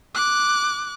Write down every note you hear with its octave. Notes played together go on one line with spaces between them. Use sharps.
D6 F#6